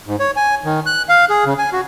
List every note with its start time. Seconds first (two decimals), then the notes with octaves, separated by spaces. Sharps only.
0.07 G#2
0.20 C#5
0.36 G#5
0.65 D#3
0.86 F#6
1.09 F5
1.29 G#4
1.45 C#3
1.58 G#5
1.72 F#4